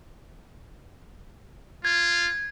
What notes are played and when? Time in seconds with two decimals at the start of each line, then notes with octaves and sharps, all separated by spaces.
1.85 F4 G#6